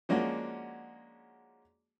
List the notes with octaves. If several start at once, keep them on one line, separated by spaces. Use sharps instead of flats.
F3 G#3 A#3 C#4 D4 F#4